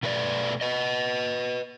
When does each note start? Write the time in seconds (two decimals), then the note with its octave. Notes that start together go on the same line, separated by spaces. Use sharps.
0.03 B2 A3 B4 C5 D5
0.61 B4 D#5